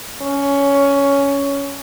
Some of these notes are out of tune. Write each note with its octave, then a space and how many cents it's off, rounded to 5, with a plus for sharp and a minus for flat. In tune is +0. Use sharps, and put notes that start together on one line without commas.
C#4 +10